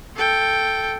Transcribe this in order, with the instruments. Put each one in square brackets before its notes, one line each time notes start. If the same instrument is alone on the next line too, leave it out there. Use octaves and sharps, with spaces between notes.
[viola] A4 G5